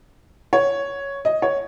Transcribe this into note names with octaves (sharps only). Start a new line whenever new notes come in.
C#5
D#5
C#5